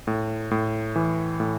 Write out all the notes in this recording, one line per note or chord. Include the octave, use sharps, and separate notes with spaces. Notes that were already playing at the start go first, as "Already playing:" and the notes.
A2
A2
E3
A2